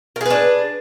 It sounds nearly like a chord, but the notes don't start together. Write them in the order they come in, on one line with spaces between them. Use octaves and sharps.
A#4 G#4 B4 D4